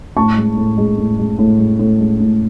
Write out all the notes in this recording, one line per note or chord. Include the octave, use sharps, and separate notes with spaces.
A2 A5 C#6
G#3
A2
G#3
A2
G#3
A2
G#3
A2
G#3
A2